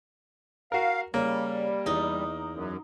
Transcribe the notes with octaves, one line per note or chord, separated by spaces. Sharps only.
F#4 A#4 F5
C#3 G3 A#3
E2 D#4
F#2